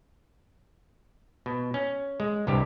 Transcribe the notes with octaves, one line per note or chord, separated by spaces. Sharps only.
B2
C#4
G#3
C2 G2 C3 G4